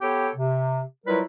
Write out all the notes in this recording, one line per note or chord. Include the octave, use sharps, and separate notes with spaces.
B3 G4 A4 C#5 G5
C3
F#3 G3 E4 F4 A#4 B4